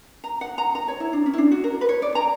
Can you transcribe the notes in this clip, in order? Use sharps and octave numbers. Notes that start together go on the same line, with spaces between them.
A#5
F#5
A#5
A#5
C#5
E4
D4
C#4
E4
D4
F#4
A#4
B4
C#5
D5
A#5